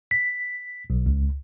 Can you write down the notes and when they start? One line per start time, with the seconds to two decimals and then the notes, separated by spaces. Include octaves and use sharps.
0.11 B6
0.90 B1
1.06 C#2